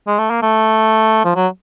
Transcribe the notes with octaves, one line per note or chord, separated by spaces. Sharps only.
G#3
A3
A#3
A3
F3
F#3